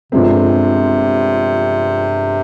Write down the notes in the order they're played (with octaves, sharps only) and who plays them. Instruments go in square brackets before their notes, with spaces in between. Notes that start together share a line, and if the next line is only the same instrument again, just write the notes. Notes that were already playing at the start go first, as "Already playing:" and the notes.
[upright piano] G1 G2 F3 G#3 C4 [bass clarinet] C3